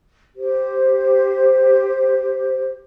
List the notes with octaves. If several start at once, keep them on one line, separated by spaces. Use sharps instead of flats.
G4 C5